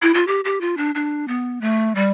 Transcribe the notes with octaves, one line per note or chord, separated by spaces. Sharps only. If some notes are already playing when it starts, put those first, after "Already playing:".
E4
F4
G4
G4
F4
D4
D4
B3
A3
G3